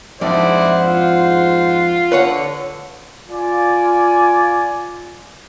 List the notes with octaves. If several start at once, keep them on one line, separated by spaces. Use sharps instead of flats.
F2 G#2 D4 E4 C5 D5 F#5
F4
D3 B4 C#5 F#5
F4 D5 G#5